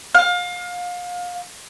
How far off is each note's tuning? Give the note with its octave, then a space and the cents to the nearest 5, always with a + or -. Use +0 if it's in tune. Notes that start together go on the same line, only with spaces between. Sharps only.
F5 +30